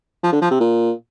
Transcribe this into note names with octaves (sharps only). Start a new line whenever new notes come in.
F3
D3
F3
C3
A#2